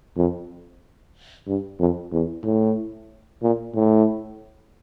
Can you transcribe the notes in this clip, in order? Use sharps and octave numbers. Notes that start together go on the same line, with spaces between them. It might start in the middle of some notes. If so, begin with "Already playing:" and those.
F2
G2
F2
E2
A2
A#2
A2